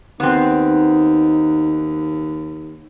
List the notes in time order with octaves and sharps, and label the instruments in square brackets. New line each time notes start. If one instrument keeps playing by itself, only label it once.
[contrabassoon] D#2 [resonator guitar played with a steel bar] B3 C4 [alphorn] D#4